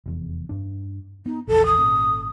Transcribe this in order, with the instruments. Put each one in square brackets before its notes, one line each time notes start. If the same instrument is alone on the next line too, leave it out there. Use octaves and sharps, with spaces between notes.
[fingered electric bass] F1 E2
G2 D4
[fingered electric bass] B3 [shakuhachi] D#4
[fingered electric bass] A#1 E2 [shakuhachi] A4
[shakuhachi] D#6
[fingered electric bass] G#1 A#2 C#4